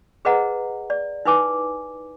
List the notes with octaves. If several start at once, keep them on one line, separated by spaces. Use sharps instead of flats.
G#4 B4 C5 D#5 F#5 A#5
D5
D#4 E4 B4 G#5 D6